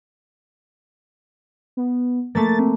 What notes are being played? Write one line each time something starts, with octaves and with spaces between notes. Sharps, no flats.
B3
A3 A#3 A6
C4